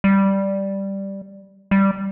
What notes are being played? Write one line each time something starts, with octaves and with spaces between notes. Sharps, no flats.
G3
G3